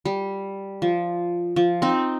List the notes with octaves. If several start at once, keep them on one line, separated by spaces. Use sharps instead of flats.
G3
F3
F3
C4 D#4